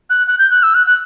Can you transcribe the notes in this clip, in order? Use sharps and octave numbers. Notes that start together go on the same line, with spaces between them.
F#6
F#6
G6
F#6
E6
F#6
F#6